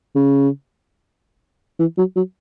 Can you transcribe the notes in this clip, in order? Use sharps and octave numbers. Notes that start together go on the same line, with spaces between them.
C#3
E3
F#3
F#3